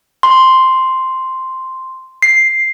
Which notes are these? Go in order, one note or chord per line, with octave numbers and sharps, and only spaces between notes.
C6
C7